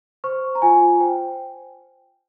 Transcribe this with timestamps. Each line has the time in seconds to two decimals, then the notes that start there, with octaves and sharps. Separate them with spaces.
0.24 C5 C#6
0.55 A#5
0.62 F4 G#5
1.00 C5 G5